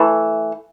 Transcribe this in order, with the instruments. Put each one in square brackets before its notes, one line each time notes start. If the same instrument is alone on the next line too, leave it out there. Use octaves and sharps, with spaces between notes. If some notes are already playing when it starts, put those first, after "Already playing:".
Already playing: [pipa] E3 A3